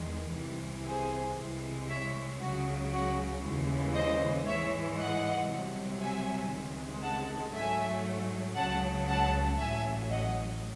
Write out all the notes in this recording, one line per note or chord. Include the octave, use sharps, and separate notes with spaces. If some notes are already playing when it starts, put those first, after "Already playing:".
Already playing: E2 D#3 G#3
C2 C3 E3
G#4 C5
C2 C3 E3 G#3
C#5 E5
C#2 C#3 F#3 F#4
F#4
D#2 C#3 E3 G#3
C5 D#5
G#2 E3 G#3 C#5 E5
D#5 F#5
C2 C3 F#3
E5 G#5
C#2 C3 D#3 G#3
F#5 A5
G#2 F#3 A3 E5 G#5
C#2 C#3 F#3 F#5 A5
F#5 A5
A1 A2 F#3 E5 G#5
D#5 F#5